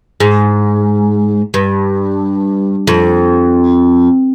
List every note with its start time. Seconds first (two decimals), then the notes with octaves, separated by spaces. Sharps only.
0.20 G#2
1.54 G2
2.87 F2